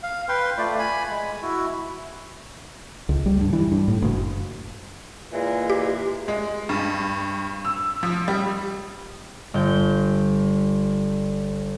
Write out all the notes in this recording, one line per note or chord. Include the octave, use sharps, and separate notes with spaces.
F5
B4 G5 C6
A3 F4 D5
G#5 B5
G#3
E4 F#4
C#2
G3
G2
E3
G2
A2
F#1
A#2 E3 G#3
G4
G#3
G2
E6
F3
G3
G1 G6